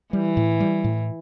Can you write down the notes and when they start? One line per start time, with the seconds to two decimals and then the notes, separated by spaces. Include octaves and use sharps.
0.13 E3 G3
0.37 A2
0.60 G3
0.84 A2